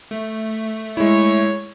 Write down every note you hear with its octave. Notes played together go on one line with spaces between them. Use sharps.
A3
G#3 E4 C#5